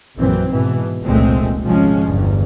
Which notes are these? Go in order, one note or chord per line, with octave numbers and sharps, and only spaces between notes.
A#1 F#2 E3 C4
G#2 B2 E3
F1 C#2 A#2 G#3 A3 C4
G#1 C3 F3 G#3 C#4
G1 E2 G2